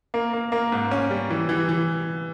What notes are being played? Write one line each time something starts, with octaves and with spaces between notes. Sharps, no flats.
A#3
A#3
A#3
G#2
C#4
G3
E3
E3
E3